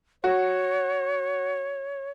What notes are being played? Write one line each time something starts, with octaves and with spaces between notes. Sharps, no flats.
F#4 C#5